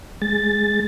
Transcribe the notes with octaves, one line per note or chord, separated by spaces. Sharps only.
G#3 A6